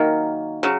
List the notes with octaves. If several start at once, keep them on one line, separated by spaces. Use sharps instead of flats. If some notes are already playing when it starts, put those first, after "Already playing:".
Already playing: D#3 F#3 A#3
C#3 F#3